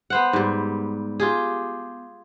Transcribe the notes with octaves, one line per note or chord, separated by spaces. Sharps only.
B3 C5 F#5
G#2 G3
F4 G4 G#4